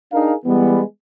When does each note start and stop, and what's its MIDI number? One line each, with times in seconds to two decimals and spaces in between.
0.13 0.33 62
0.13 0.33 63
0.13 0.33 68
0.13 0.33 70
0.13 0.33 77
0.46 0.81 52
0.46 0.81 55
0.46 0.81 56
0.46 0.81 59